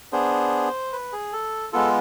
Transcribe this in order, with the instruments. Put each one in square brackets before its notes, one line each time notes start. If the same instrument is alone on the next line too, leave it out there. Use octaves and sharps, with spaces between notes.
[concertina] B3 D4 G#4 C5
B4
G#4
A4
G#3 B3 F4 A4